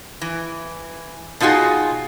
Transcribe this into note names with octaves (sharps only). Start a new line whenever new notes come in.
E3
B2 D#4 F4 F#4 G#4